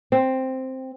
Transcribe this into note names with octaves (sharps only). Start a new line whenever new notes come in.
C4